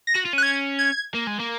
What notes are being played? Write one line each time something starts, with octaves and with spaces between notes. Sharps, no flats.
A#6
F#4
F4
C#4 F#6
G#6
G#6
A#3
G#3
A#3